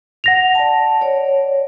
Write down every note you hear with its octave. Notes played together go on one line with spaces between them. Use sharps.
F#5 A#6 F7
D5 A5
C#5 D5